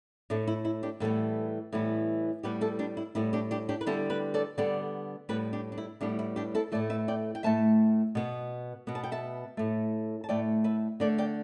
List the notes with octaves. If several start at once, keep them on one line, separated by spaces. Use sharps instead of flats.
A2 A3 D4
E4
E4
D4 G4
A2 E3 G3 B3 E4 A4
A2 E3 G3 B3
A2 G3 B3 G4 B4
E4 A4
D4 G4
E4
A2 G3 B3 E4
D4 G4
D4 G4
D4 G4
B4
D3 G3 B3 E4 A4
G4 B4
A4 D5
D3 G3 B3 A4 D5
A2 G3 B3 G4 B4
D4 G4
D4
E4
A2 G3 B3 D4
E4
D4 G4
E4 A4
A2 A3 A4 D5
B4 E5
D5 G5
G5
A2 A3 E5 A5
B2 B3
B2 B3
A5
G5
E5 A5
A2 A3
A5
A2 A3 D5 G5
B4 E5
D3 A3 A4 D5
D5 G5